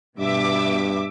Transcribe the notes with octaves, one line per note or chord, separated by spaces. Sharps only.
G2 B2 E5 D6